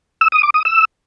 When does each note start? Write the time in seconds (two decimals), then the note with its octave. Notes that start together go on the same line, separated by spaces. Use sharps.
0.21 E6
0.32 D#6
0.43 D6
0.54 D#6
0.65 E6